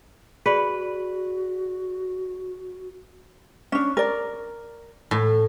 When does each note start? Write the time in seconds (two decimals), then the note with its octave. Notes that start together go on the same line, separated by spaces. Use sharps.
0.46 F#4 G#4 B4 D5 F#7
3.72 C#4 D4
3.97 A#4 D5
5.11 A2